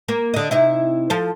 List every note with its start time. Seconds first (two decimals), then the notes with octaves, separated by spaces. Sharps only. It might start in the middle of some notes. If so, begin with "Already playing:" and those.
0.08 A#3
0.34 D3 D#5
0.51 C3 D#4 E4
1.10 F3 A4 C5